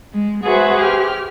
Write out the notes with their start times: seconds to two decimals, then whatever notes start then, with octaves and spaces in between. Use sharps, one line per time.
0.13 G#3
0.45 F#4 G#4 B4 C5 E5
0.80 G4 F6